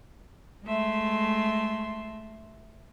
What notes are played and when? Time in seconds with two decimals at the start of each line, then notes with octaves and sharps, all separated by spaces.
0.65 G#3 A3 E5 C6